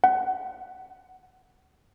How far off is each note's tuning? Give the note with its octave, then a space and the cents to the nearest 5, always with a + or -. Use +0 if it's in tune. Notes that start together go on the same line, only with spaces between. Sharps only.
F#5 +25